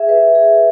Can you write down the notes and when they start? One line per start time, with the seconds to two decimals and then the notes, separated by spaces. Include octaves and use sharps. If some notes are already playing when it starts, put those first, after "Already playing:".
Already playing: G#4 E5
0.09 B4
0.35 G#4